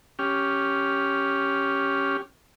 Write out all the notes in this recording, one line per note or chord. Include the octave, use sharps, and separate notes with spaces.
C#4 G4 F6